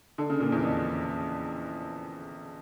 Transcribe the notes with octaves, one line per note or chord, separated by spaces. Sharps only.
D3
C#3
A#2
E2
F2